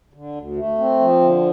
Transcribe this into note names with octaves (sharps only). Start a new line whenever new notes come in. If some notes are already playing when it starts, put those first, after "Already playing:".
D3
D2
A3
C4
F3
D3